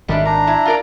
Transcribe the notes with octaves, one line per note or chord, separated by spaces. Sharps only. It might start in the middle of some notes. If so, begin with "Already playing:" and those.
G#1 D#3 G3 A3 D4
A#2 D4 A#5
E4
F4 A#4 D5